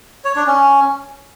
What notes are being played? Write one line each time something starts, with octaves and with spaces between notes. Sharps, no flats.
C#5
D4
C#4